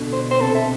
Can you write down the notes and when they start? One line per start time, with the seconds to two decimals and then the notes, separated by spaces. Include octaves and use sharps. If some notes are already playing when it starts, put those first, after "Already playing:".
Already playing: B2 D3
0.13 C5
0.31 C5
0.41 C3 A4
0.55 E5